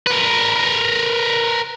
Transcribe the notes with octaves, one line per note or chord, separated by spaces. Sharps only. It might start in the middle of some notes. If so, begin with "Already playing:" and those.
A#4 B4